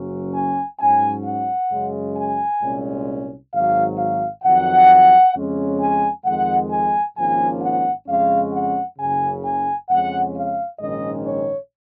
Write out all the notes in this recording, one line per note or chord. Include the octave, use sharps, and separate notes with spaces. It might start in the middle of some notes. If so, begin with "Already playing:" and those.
Already playing: F#1 F#2 C#3 F#3 C#4
G#5
G#2 F#3 C#4 G#5
F#5
F#2 C#3 G#3
G#5
C2 A#2 G#3 C#4
G#1 G#2 F#3 F5
F5
F2 D#3 F#3 F#5
F2 C#3 G#3 C#4
G#5
F2 D#3 G#3 F#5
G#5
G#1 G#2 F3 A#3 C#4 G#5
F#5
F2 C#3 G#3 C#4 F5
F#5
F#1 F#2 C#3 G#5
G#5
F2 C#3 G#3 C#4 F#5
F5
A#1 G#2 D#3 G#3 C#4 D#5
C#5